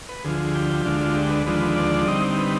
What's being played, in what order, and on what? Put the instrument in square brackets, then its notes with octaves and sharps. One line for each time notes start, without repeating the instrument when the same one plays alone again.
[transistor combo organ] B4
D2 D3 F3 G#4
G4
D2 D3 G#3 D4 F4
F4
G4
B4
D#2 D3 F3 G#3 D4 B4
D5
D3 G3 C4 D#4 D#5
B4